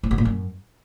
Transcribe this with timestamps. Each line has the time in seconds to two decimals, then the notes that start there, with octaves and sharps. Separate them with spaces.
0.03 A2
0.11 B2
0.18 A#2
0.25 F#2